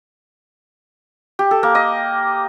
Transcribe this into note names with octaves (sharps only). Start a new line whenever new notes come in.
G4
A4
A#3
D#5